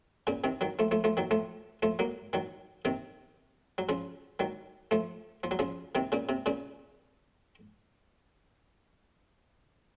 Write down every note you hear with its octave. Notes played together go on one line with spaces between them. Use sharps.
A#2 C#3
C3 D#3
D#3 F#3
F3 A3
F3 A3
F3 A3
D#3 F#3
F3 A3
F3 A3
F#3 A#3
D#3 F#3
C3 D#3
F#3
C#3 F3
D#3 F#3
F3 A3
F3
F#3
C#3 F3
C3 D#3
A#2 C#3
C3
A#2 C#3